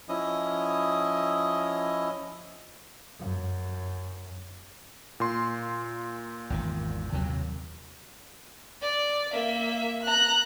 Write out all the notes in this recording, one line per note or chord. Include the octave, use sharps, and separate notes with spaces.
F3 C#4 E4 D#5 D#6
F#2
A#2 C6
G#1 E2 D#3
D#2 C3 F#3
D5
A#3 E5
A#5 F#6